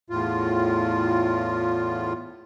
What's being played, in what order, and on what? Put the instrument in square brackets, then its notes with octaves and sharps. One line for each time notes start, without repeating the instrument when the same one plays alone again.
[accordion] E2 A2 F4